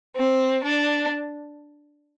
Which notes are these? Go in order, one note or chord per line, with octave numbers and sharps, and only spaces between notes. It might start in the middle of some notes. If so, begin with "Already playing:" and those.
C4
D4